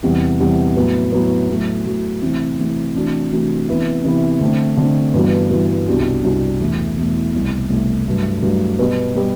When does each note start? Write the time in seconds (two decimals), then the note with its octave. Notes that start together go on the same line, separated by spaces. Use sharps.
0.03 E2 C3 G3
0.40 E2 C3 G3
0.76 A2 F#3 B3
1.12 A2 F#3 B3
1.49 A2 F#3 A3
1.85 A2 F#3 A3
2.22 C3 E3 A3 C4 E4
2.59 C3 E3 A3 C4 E4
2.95 C3 E3 A3 D4 F#4
3.31 C3 E3 A3 D4 F#4
3.68 C3 E3 B3 E4
4.04 C3 E3 B3 E4
4.41 D3 A3 C4
4.77 D3 A3 C4
5.14 G2 E3 B3 F#4
5.51 G2 E3 B3 F#4
5.87 C2 B2 G3 D4 F#4
6.23 C2 B2 G3 D4 F#4
6.60 E2 B2 A3
6.96 E2 B2 A3
7.33 C2 B2 A3
7.70 C2 B2 A3
8.06 G2 F#3 A3
8.43 G2 F#3 A3
8.79 B2 G3 B3
9.15 B2 G3 B3